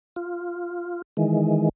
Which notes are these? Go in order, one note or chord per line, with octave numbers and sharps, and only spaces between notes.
F4
D#3 E3 G#3